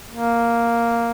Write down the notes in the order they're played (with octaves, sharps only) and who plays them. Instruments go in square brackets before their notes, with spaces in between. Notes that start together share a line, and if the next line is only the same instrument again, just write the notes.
[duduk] A#3